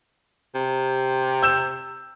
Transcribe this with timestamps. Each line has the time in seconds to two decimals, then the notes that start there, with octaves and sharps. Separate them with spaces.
0.55 C3
1.43 E6 G6 E7